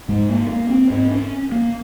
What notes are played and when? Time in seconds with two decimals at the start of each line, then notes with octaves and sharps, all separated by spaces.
0.08 G#2 G#3
0.29 A#3
0.49 A#3
0.70 C4
0.90 G#2 C4
1.11 C#4
1.52 A#3